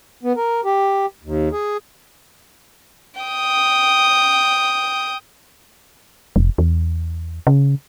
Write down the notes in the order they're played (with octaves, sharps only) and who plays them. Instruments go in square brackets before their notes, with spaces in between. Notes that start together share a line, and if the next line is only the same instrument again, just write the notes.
[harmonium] B3
A#4
G4
D#2
G#4
[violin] G5 D#6
[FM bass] F1
E2
C#3